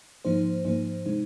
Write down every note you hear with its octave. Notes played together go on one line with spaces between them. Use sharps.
G#2 F3 A#3 D#4 C5
G#2 F3 A#3 D#4 C5
C3 G#3 D#4